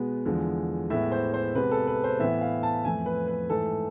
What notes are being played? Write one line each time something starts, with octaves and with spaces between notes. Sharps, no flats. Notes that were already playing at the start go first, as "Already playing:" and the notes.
Already playing: B2 G#3 B3
E2 D3 F3 G#3
A2 G#3 B3 E5
C5
C5
C3 G#3 B3 B4
A4
B4
C5
A2 E3 B3 E5
F5
A5
F2 E3 A3 G#5
B4
B4
G#2 E3 A3 A4